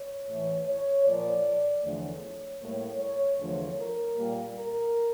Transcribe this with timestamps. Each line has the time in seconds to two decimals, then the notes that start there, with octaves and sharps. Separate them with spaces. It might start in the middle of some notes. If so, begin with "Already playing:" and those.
Already playing: C#5
0.27 A2 E3 A3
0.66 C#5
1.05 A#2 F3 A#3 D5
1.83 E2 D3 F3 A3 C#5
2.60 A2 G3 A#3 C#5
2.99 C#5
3.38 E2 D3 F3 A3 C#5
3.77 A#4
4.16 A#2 G3 A#3
4.55 A#4